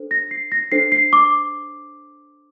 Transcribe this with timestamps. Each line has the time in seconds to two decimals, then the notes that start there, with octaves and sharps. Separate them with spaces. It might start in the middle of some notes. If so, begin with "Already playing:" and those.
Already playing: D4 A4 C5
0.11 A#6
0.31 C7
0.52 A#6
0.72 D4 A4 C5 C7
0.92 C7
1.13 D6